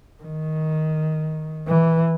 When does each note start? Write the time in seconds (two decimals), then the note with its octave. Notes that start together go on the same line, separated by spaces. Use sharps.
0.23 D#3
1.68 E3